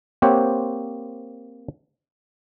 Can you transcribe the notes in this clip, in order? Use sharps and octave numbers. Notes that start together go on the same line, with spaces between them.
A#3 C4 G4 C5 C#5 F#5